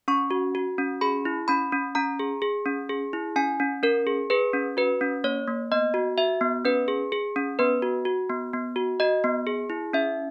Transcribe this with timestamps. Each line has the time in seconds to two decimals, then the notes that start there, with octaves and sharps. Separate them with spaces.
0.08 C#4 C#6
0.31 F#4
0.55 F#4
0.78 C#4
1.01 G#4 B5
1.25 E4
1.48 C#4 B5
1.72 C#4
1.95 C#4 A#5
2.19 G#4
2.42 G#4
2.66 C#4
2.89 G#4
3.13 E4
3.36 C#4 G#5
3.60 C#4
3.83 C#4 A#4
4.07 G#4
4.30 G#4 B4
4.53 C#4
4.77 F#4 B4
5.01 C#4
5.24 A#3 C#5
5.48 A#3
5.72 B3 D#5
5.94 F#4
6.18 F#4 E5
6.41 B3
6.65 C#4 B4
6.88 G#4
7.12 G#4
7.36 C#4
7.59 B3 B4
7.82 F#4
8.05 F#4
8.30 B3
8.53 B3
8.76 F#4
9.00 F#4 D#5
9.24 B3
9.47 G#4
9.70 E4
9.93 C#4 E5